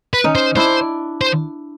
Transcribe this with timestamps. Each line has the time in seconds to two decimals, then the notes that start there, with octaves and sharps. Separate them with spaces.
0.14 B4
0.24 C#4 D#4
0.35 C5
0.56 D4 E4 C5
1.21 C5